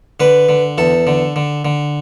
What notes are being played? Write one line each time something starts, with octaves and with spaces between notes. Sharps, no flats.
D3 B4
D3
E2 A4
D3
D3
D3